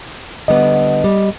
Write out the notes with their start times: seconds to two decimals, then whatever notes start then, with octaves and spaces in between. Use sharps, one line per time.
0.48 D3 G3 B3 D#5
1.04 G3